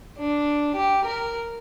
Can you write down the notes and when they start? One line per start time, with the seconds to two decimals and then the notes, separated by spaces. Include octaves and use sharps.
0.18 D4
0.76 G4
1.05 A#4